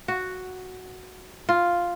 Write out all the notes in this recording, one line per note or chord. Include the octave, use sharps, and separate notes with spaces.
F#4
F4